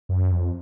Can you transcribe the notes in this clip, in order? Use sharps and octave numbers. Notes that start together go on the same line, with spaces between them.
F#2
F2